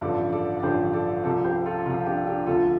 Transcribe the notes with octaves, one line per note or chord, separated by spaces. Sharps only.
A1 G2 D3 F3 A4 D5
A4 D5
D5
A1 G2 D3 F3 G4 C5
A4 D5
C2 C3 F3 A4 D5
G4 C5
F4 A4
C2 C3 F3 F4
D4 G4
D4 G4
D2 C3 F3 F4 A4